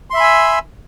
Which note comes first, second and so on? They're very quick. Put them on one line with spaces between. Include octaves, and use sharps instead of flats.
C6 E5 B5 G#5 E6